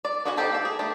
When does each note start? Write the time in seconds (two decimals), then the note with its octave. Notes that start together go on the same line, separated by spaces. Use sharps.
0.05 D5
0.25 B3 F#4 B4 F#5 G#5
0.37 B3 C4 D#4 G4 A4
0.51 A#3 A4
0.65 G#4
0.79 A3 B3 D4 G4